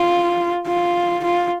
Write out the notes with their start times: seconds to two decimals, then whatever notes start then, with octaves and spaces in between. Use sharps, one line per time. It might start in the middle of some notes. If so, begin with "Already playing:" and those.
Already playing: F4
0.67 F4
1.24 F4